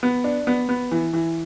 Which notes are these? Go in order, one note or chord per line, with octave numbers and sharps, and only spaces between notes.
B3
D4
B3
B3
E3
E3